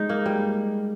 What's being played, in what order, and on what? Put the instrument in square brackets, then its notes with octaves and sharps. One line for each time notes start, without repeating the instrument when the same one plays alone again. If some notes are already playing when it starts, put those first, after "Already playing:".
Already playing: [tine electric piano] G#3 [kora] D#4
[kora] A#3
G3